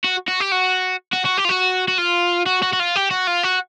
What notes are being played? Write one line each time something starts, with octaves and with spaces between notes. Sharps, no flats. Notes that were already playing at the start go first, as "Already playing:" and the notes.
F#4
F#4
G4
F#4
F#4
F#4
G4
F4
F#4
F#4
F4
F#4
F#4
F#4
F4
G4
F#4
F4
F#4